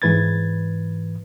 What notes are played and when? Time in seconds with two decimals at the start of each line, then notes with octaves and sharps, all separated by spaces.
0.02 G#2 E3 B4 G#6 A6